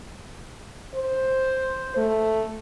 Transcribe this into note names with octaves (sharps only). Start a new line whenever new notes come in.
C5
A3